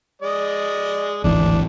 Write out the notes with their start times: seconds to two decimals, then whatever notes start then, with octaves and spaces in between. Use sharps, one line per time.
0.22 G#3 D5 D#5
1.24 D1 G#1 E3 D4